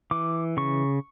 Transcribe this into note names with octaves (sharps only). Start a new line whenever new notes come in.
E3 D6
C#3 C#6